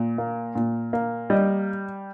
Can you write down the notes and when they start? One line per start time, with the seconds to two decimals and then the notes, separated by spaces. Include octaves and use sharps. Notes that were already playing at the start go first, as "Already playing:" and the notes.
Already playing: A#2
0.18 A#3
0.55 A#2
0.93 A#3
1.30 G3 D#5